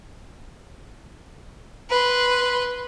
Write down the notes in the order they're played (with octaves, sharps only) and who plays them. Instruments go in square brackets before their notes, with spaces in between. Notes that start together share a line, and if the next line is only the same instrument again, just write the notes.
[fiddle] B4 C6